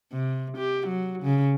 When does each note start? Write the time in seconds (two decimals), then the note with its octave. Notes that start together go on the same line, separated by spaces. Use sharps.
0.12 C3
0.58 G4
0.88 F#3
1.23 C#3